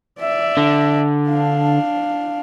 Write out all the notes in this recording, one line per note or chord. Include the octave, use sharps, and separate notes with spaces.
D5 E5
D3
D4 F5